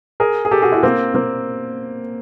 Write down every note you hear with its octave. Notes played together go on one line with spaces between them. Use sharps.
G#4 A#4
G#4
G4 A4
F#4 G#4
E4 F#4
A#3 C4
A#3 C4